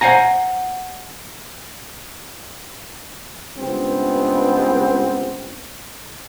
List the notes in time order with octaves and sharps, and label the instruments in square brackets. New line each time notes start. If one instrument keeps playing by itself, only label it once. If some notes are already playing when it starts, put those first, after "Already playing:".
[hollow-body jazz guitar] C5 F5 F#5 G#5 A#5
[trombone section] C#2 G2 B3 C4